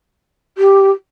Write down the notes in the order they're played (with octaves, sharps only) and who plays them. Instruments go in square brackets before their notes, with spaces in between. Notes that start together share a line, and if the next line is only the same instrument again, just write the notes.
[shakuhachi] G4